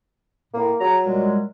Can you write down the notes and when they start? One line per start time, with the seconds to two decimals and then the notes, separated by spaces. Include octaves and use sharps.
0.54 A2 A#3
0.80 F#3 F#4 G#4 A#5
1.05 A#2 G3 G#3